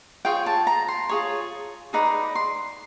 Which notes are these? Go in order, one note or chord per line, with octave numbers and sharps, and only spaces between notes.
F4 G#4 C#5 G5
A5
A#5
C6
F4 G#4 C#5
D#4 G#4 B4 D5 A#5
C6